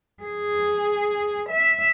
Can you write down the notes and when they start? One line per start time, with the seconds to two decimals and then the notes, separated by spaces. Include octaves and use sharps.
0.23 G#4
1.49 E5